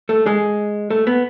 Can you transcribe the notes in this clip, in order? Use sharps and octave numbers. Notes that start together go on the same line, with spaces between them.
A3
G#3
A3
B3